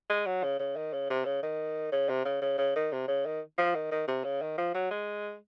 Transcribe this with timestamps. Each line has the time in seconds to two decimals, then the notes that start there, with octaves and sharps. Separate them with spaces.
0.10 G#3
0.26 F#3
0.44 C#3
0.59 C#3
0.76 D#3
0.93 C#3
1.10 C3
1.26 C#3
1.43 D#3
1.93 C#3
2.09 C3
2.25 C#3
2.42 C#3
2.58 C#3
2.76 D#3
2.92 C3
3.08 C#3
3.26 D#3
3.58 F3
3.75 D#3
3.92 D#3
4.08 C3
4.24 C#3
4.42 D#3
4.58 F3
4.75 F#3
4.91 G#3